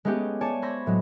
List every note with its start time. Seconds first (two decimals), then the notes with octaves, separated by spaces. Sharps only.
0.05 G#3 A3 B3 C#4 G4 G#4
0.41 C#5 D5 G#5 A5 D6
0.62 C5 B5 C#6 E6 G#6 A#6
0.86 A2 F#3 G#3